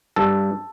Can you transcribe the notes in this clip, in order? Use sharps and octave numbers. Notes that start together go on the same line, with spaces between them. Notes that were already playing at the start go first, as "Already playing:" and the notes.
G2 A4